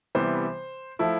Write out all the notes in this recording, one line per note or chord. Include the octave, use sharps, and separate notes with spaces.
C3 E3 G3 B3 C5
F3 A3 E4